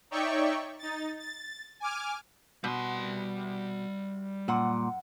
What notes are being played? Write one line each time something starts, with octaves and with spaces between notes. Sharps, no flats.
D#4 C#5 D5 E5 G5 C#6
D#4 A6
A6
G#5 D6 F6
B2 G3 C6
F#2 A#2 F#5